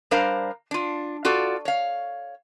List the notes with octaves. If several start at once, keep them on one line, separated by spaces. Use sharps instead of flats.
G3 D4 A#4 C5 F5 A#5
D4 F4
F4 F#4 A4 D5
C#5 F5